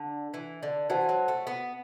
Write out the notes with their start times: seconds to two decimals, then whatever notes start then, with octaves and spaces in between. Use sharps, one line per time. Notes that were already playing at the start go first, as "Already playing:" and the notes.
Already playing: D3
0.34 E3
0.63 D3
0.90 E3 F#4 C5 F#5 A5
1.09 F#3
1.28 A3
1.47 B3